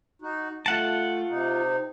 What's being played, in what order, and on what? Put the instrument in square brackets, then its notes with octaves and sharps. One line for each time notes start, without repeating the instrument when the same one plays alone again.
[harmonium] D#4 F#4
[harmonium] A3 [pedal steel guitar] F4 F#5 A5
[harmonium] C3 D#4